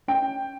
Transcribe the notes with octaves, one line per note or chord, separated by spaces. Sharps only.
C#4 G5